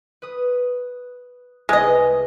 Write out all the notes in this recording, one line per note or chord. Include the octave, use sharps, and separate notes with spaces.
B4 D#6
C2 G#3 B3 B4 D#5